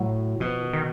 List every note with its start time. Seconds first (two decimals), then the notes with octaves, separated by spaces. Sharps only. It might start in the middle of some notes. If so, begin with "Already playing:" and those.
Already playing: A2 F#3
0.40 B2 F3
0.62 D#3
0.73 D#3